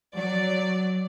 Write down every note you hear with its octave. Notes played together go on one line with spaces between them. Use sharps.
F#3 D5